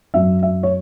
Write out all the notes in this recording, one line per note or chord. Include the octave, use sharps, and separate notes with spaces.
F#2 F#3 E5
E5
C#5